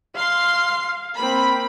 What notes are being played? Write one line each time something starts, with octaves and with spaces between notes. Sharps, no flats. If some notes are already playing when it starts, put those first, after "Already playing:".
F5 C6
A#3 C4 B5